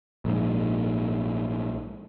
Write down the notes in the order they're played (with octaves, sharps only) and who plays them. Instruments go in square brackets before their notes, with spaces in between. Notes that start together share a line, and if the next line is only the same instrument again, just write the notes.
[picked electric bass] A#1 G#2